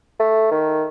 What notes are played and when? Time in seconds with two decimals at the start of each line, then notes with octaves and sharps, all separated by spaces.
0.19 A3
0.51 D#3